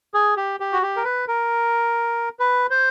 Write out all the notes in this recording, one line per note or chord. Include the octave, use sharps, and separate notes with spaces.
G#4
G4
G4
F#4
G4
A#4
B4
A#4
B4
C5